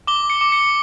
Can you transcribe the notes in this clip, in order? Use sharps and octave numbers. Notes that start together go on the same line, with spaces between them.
D6 G7
C#7
D6
C#7